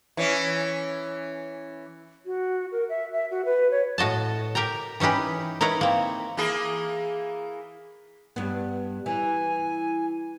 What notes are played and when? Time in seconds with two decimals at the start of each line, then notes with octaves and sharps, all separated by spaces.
0.17 E3 C#4
2.26 F#4
2.72 A#4
2.89 E5
3.13 E5
3.31 F#4
3.45 B4
3.71 C#5
3.98 A2 F#4 D#5 A5
4.55 G4 A#4 G5 A#5
5.00 E3 C#4 D#4 G4 B4
5.61 D#4 E4 A#4 B4 C#5
5.81 A#3 C4
6.37 E3 A#3 G#4
8.36 G2 B3
9.06 E3 G#5